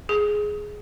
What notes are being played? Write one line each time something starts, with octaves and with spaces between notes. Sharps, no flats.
G#4